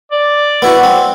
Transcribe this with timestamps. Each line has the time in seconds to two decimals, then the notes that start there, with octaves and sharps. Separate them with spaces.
0.12 D5
0.62 B3 E4 F#4
0.83 C4